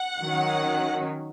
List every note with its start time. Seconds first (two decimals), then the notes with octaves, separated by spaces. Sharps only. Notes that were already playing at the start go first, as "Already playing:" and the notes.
Already playing: F#5
0.22 D#3 F#3 C#4